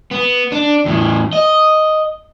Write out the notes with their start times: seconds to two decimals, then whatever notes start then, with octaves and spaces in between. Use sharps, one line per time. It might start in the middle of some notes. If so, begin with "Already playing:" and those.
0.11 B3
0.52 D4
0.85 E2 A2
1.33 D#5